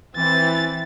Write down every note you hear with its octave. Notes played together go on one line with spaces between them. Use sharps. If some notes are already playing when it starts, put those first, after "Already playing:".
E3 C4 A6